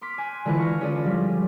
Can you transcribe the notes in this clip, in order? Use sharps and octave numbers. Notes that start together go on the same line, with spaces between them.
C6 D6 F6 B6
G#5 F#6
D3 E3 G#3 F4 B4
C#6 F6 A#6
C#4 D4 F4 G#4 A4 D5
F3 G3